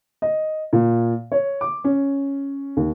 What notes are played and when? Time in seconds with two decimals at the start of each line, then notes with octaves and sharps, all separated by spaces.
0.22 D#5
0.73 A#2
1.32 C#5
1.61 D6
1.84 C#4
2.77 D#2